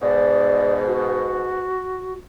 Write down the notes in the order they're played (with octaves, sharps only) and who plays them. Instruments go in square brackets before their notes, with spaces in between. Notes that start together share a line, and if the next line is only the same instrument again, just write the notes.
[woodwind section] G#2 B2 [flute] D5
[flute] F#4